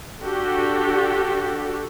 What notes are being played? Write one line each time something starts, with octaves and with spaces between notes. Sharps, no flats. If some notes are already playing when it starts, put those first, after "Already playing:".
D4 F#4 G4 A4